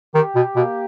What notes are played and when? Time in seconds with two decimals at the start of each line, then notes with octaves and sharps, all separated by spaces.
0.14 D#3 G4
0.35 B2
0.56 B2 A#3